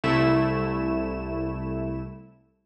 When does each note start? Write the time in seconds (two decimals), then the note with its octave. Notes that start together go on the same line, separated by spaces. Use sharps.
0.04 C2 A3 E4 E7